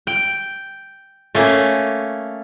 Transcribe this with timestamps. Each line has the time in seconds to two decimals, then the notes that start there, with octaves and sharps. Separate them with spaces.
0.07 G5
1.35 A3 A#3 C#4